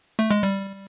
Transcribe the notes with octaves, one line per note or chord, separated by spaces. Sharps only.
A3
G#3
G3